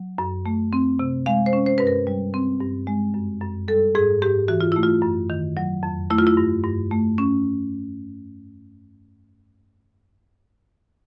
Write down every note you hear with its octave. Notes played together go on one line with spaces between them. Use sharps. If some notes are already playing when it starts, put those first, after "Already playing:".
Already playing: F#3
F#2
A3
C4
C3
G#3 F5
C5
C#4
C5
G2 B4
A#4
G3
C4
G2
G#3
F#2
F#2
G3 A4
G#2 G#4
G#2 G4
E3 F#4
F4
A3 E4
F4
F#2
D#3
F#3
F2
A3 E4
F4
E4
G2
G2
A3
C#4